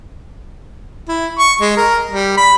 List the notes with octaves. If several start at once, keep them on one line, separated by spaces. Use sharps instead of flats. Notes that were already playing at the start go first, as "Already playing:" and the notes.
E4
C#6
G#3
A#4
G3
B5